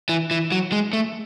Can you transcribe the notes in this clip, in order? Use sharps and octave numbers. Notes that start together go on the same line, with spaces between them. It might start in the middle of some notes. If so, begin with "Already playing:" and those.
E3
E3
F#3
G#3
A3